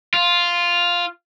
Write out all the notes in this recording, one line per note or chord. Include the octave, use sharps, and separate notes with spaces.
F4